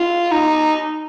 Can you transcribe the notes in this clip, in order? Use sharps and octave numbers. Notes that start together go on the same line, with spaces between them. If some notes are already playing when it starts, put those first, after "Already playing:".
Already playing: F4
D#4